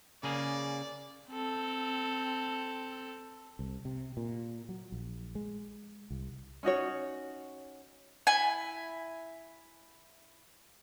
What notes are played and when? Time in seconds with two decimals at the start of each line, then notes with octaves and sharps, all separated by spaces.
0.23 C#3 A#3 G#4 D5
1.29 C4 A4
3.59 C2
3.85 C3
4.17 A#2
4.69 F#3
4.92 A#1
5.35 G#3
6.10 C2
6.63 C#4 D#4 F#4 C#5
8.27 E4 G#5